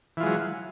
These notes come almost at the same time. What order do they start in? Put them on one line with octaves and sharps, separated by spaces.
E3 F4 G#3 F#3